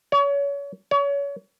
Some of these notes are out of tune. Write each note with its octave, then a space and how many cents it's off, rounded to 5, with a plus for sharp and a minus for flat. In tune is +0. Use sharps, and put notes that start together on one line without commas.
C#5 +30
C#5 +30